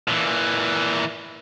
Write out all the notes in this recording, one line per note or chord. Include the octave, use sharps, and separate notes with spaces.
A#2 E3